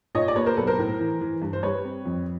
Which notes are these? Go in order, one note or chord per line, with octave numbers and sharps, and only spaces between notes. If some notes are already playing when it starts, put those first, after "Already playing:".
A#2 C#5 D#5
D5
A#3 B4 C#5
A#4 C5
B1 A4 B4
A#4 C5
A2
E3
E3
G2
C5
G3 B4 C#5
C4
F2